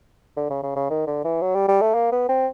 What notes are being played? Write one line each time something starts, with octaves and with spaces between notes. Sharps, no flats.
D3
C#3
C#3
C#3
D#3
D3
E3
F#3
G3
G3
A3
A#3
B3
C4